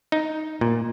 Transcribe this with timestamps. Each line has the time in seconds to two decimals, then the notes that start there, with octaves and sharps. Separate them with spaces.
0.12 D#4
0.61 A#2